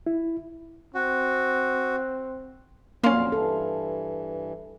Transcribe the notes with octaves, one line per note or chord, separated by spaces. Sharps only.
E4
C4 F#4
F2 A#2 F#3 A#3 C#4 F5 C6
G2 E3 A4